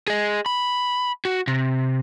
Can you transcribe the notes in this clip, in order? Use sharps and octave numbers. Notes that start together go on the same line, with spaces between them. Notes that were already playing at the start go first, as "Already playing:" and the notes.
G#4 D#5
B5
F#4
C3